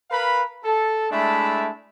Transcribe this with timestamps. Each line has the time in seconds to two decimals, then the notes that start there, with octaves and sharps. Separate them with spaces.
0.11 A#4 B4 F5 B5
0.64 A4
1.11 G#3 A3 D4 E4 E5 B5